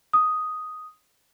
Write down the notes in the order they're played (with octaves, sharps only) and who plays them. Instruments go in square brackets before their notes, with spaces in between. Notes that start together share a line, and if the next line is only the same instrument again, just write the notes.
[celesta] D#6